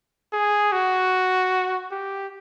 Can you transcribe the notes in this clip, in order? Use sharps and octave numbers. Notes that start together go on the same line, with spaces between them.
G#4
F#4
G4